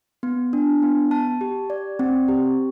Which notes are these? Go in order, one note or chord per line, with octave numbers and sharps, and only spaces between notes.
B3
D4
B3
A5
G4
D5
C4
G4